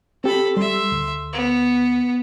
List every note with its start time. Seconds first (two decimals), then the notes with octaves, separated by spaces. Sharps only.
0.24 C4 G4 A4 B5
0.57 G3 E5 C6
0.92 D2
1.33 B3